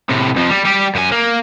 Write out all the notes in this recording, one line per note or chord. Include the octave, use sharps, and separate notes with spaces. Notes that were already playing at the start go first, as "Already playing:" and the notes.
A2 C3
F2 F3
G3
G3 G4
F#2 G#5
A#3